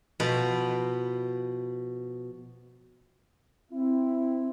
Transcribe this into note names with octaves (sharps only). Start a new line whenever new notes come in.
B2 F3 B4
C4 E4